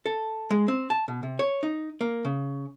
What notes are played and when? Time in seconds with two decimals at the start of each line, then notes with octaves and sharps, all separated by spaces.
0.06 A4
0.50 G#3
0.68 C4
0.90 A5
1.08 B2
1.23 C3
1.39 C#5
1.63 D#4
2.01 A#3
2.25 C#3